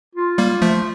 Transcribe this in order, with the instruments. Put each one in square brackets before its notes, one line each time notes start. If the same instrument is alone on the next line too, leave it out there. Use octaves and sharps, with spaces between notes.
[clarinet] F4
[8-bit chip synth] G3 A#3
F3 A3